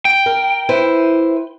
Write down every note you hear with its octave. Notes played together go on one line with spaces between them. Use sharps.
G5
A#4
E4 B4 C5